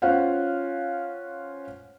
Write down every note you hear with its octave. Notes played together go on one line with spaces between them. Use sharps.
C#4 F4 C5 F5 F#5